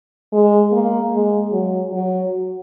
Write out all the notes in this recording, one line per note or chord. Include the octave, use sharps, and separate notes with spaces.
G#3
A#3
G#3
F#3
F#3